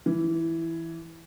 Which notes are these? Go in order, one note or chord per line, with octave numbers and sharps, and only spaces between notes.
E3